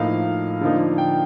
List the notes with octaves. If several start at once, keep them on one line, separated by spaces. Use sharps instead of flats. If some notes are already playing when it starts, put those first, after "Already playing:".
Already playing: A2 F3 A#3 D#4 F5
D3 F3 A#3 D#4
G5